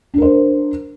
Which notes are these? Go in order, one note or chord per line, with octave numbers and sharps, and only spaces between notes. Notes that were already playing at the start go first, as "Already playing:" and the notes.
D4 A#4 C5